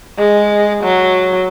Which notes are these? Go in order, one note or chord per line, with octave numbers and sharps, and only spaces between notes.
G#3
F#3